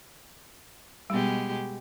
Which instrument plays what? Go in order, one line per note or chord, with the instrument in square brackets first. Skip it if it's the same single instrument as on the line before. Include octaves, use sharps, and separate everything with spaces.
[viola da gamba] B2 G#3 G4 [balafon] G3 B3